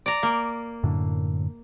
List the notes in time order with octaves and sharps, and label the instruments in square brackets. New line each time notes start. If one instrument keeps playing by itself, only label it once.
[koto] D5 A#5
A#3
[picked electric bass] F#2 A2 D3